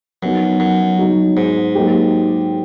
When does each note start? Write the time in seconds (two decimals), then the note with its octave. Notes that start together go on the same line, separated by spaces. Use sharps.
0.22 F#2 F#3 B3 D#4 F#4
0.60 F#2
0.98 F#3 B3 D#4 F#4
1.37 G#2
1.75 F#3 A#3 D#4 G4